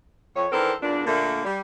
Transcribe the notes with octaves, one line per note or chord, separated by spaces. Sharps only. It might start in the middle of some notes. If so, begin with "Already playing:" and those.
F2 C#5
D#3 E3 D4 A4 A#4 C5
E2 A#2 D4
A#2 D3 A3 A#3
G3